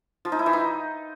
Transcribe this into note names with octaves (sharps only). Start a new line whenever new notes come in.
F3
D#4
E4
E3
D#4